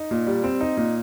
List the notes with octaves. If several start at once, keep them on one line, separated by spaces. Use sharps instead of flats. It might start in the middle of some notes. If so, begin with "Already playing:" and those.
Already playing: D#4
A#2
G3
C4
D#4
A#2